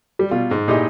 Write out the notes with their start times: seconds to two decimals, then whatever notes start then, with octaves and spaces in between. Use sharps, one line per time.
0.19 G3
0.31 B2 G3 F4
0.51 G#2
0.68 A#2 D#4 E4 G4 G#4 D#5